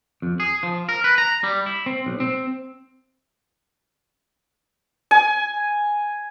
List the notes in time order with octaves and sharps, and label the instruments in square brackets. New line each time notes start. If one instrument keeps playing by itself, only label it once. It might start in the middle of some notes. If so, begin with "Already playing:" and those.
[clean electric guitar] F2
G#4
F3
A#4
B4
A#5
G3
E4
C4
B1
C4
[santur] G#5